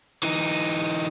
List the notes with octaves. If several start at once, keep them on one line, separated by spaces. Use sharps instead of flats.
E3 D#4